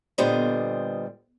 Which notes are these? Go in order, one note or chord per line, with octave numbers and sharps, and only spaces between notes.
A#2 D3 G3 B3 C5 D#5